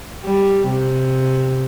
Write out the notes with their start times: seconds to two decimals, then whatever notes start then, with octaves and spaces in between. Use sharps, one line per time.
0.24 G3
0.70 C3